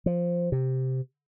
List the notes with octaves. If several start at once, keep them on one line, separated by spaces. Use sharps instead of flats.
F3
C3